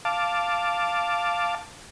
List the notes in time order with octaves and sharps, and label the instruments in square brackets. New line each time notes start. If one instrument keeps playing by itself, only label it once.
[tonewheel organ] F5 A5 D6